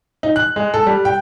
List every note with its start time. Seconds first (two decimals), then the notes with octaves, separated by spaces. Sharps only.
0.23 D#4
0.36 F#6
0.56 G#3
0.74 A4
0.87 G3
1.05 G5